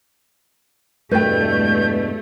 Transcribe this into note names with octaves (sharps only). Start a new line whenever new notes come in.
E2 G2 B2 A3 B4 G5 G6